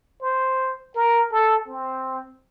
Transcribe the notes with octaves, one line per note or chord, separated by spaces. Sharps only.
C5
A#4
A4
C4